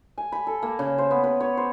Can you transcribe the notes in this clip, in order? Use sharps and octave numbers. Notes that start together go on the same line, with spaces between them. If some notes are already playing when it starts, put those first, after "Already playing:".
G#5
B5
A4
A#3
C#3
C5
B3
B4
C#5
C5